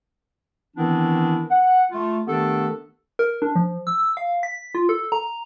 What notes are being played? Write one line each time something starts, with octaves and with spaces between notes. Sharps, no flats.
D#3 E3 B3 C4 D4 E4
F#5
A3 F4
D#3 A3 B3 D4 G4 A4
A#4
D4
F3
E6
F5
B6
F4
A4
A#5